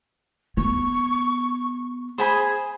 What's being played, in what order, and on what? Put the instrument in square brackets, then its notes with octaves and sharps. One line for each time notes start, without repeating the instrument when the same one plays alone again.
[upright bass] B3 [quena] C#6
[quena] G#4 [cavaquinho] C5 G#5 B5